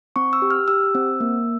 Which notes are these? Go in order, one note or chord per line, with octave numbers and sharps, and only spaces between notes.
C4 C#6
E6
G4
F6
G4 E6
C4
A#3